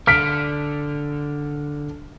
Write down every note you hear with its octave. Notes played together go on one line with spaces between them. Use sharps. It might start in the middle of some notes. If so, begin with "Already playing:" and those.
D3 F6 B6 D7